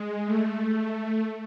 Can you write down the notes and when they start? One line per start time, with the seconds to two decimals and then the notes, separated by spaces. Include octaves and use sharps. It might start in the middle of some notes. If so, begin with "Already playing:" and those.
Already playing: G#3
0.26 A3